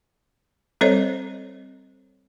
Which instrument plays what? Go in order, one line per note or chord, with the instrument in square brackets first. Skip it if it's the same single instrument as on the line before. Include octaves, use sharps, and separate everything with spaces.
[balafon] G3 C4 A4 C5 C#5 D#5